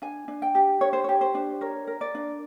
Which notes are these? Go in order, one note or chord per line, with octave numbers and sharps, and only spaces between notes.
D4 G#5
D4
G5
G4
D4 C#5
C5
G4 C#5
C5
D4
A#4 C#5
A#4
D5
D4